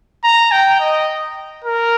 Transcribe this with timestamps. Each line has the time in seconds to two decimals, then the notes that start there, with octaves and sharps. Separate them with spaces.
0.24 A#5
0.52 G5
0.80 D#5
1.64 A#4